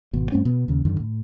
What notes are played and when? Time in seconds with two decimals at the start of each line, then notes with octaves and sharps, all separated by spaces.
0.13 G#1 B2
0.32 G2 A3 C4 C#4
0.45 B2 B3
0.68 D#2 C#3
0.85 F#2 D3 D#3
1.00 A2